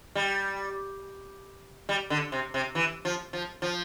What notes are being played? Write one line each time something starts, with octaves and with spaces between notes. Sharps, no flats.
G3
G3
D3
C3
C3
E3
F3
F3
F3